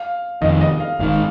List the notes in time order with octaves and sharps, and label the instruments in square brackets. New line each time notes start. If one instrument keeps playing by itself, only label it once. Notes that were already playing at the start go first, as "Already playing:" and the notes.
Already playing: [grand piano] F5
[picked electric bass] F1 F2 D#3 [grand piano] D#5
[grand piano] D#5
F5
[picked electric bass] G#1 G#2 D#3 [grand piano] F5